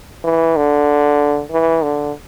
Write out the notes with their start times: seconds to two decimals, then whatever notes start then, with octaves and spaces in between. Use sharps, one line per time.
0.24 E3
0.56 D3
1.51 E3
1.83 D3